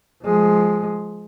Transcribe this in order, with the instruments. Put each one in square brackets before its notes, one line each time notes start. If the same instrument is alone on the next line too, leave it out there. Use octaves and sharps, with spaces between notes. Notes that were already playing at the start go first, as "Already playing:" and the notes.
[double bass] F3 G#3